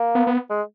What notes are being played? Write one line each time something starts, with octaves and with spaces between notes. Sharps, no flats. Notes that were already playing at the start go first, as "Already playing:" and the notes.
Already playing: A#3
B3
B3
G#3